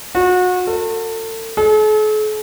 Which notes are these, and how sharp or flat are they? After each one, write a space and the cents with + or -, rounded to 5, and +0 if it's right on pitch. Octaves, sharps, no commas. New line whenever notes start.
F#4 -30
A4 +35
A4 -45